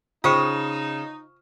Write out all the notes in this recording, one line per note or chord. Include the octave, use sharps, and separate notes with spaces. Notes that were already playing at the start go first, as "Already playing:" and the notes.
C#3 D#4 F4 C5 G5 C#6 D#6